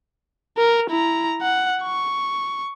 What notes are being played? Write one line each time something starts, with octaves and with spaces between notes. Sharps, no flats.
A#4
E4 A#5
F#5
C#6